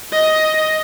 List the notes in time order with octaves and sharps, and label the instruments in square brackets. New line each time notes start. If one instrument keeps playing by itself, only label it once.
[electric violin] D#5